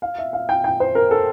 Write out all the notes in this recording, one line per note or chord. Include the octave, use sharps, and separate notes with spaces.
F5
E5
F5
G5
G5
C5
A#4
A4